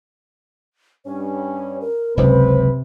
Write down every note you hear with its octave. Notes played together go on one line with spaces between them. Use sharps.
G2 C#4 C#5
A#4
F#1 C#2 C3 B4 C5